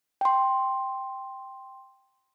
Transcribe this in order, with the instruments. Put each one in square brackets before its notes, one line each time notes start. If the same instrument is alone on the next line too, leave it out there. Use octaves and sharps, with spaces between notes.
[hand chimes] G5 C6